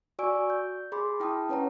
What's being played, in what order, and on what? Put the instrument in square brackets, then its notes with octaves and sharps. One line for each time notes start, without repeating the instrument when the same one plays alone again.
[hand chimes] F#4 D5 G#5 C#6 E6 D7
G6
G#4 B5 C6 D6
E4 G5 A5 D#6
C#4 B4 C#5 F#5 A#5